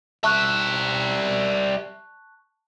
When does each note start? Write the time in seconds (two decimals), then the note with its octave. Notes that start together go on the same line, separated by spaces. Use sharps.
0.24 G3 E5 A5 C#6 F#6